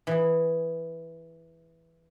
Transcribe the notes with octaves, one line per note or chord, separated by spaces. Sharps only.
E3 G#4